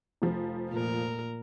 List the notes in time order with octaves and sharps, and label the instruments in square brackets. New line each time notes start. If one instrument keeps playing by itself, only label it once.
[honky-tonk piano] F1 F3
[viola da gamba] A#2 A#4